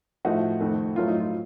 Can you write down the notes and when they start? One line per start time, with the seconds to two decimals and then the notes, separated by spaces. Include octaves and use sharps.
0.25 A2 F3 A3 D#4 F#4
0.61 F2 D#3 A3
0.96 A2 F#3 A3 F4
1.08 D#4
1.20 F4